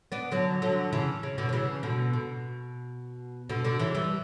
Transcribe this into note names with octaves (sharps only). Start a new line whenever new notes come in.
B3 D4
D3 F#3
D3 F#3
C#3 E3
C#3
B2 D3
F#3
C#3 E3
B2 D3
B2
B2 D3
B2 D3
C#3 E3
E3 G3